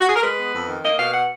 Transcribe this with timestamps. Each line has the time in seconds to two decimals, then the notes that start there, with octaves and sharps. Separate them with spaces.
0.01 F#4
0.09 G#4
0.16 A#4
0.22 G#3 B4
0.38 B3
0.54 F2
0.68 D#3
0.84 A#3 D#5
0.99 B2 F5
1.14 F#5